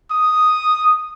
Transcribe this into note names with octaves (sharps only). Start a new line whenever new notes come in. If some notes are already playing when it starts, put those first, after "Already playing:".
D#6